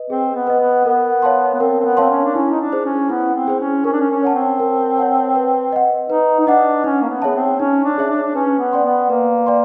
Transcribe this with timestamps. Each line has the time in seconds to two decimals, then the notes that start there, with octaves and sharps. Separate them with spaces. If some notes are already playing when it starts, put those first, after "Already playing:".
Already playing: B4 D#5
0.10 C4 G#4
0.35 B3
0.47 B4 D#5
0.60 B3
0.85 B3 A#4
1.22 C#5 F5 A5 C6
1.54 B3
1.60 C4 A#4
1.80 C4
1.85 B3
1.97 C4 C#5 F5 A5 C6
2.10 C#4
2.24 D4
2.35 C#4 E4
2.51 D#4
2.60 D4
2.72 G#4 C5
2.85 C#4
3.09 B3 E4
3.35 C4
3.48 G#4 C5
3.60 C#4
3.84 C#4 A#4
3.92 D4
4.00 C#4
4.10 C#4
4.23 C#5 F#5 A5
4.35 C4
4.60 A#4
4.98 C#5 F#5 A5
5.35 B4
5.72 D#5 F#5
6.10 D#4 B4
6.39 D#4
6.47 D4 D#5 F#5
6.84 C#4 D#4
7.02 A#3
7.10 B3
7.22 B3 G#4 C#5 E5 A5
7.35 C4
7.60 C#4 D#4
7.84 D4
7.98 G#4 C#5 E5 A5
8.10 D4
8.23 D4
8.35 C#4 B4
8.59 B3
8.73 D5 G5 C6
8.84 B3
9.10 A#3 B4
9.46 D5 G5 C6